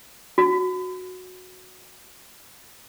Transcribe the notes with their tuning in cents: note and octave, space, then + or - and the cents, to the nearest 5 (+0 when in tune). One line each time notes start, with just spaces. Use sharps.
F#4 -10